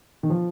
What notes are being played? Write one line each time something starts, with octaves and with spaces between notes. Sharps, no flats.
D#3
F3